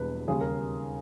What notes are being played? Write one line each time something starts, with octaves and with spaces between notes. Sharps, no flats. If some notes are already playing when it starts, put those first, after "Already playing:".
Already playing: E1 E2 B2 G3 B4
D#2 C#3 G3 G#4
A#4